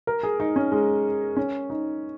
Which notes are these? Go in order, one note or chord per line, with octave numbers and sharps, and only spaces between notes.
A#4
G#4
D#4
C#4
G#3
C#4
D#4